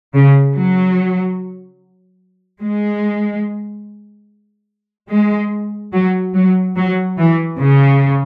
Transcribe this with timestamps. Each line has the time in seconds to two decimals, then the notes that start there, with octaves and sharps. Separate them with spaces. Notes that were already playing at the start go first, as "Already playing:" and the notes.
0.14 C#3
0.55 F#3
2.61 G#3
5.10 G#3
5.93 F#3
6.34 F#3
6.77 F#3
7.18 E3
7.59 C#3